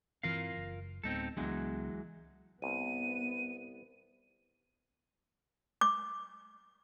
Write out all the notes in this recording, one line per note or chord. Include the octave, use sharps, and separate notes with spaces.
G2 E3 C4 F4 A#4 F5
F#1
D1 G#3 B3 C4 D#4 A4
C#2 E3 F#3 G#3 B3 D4
C2 B3 D#7
D6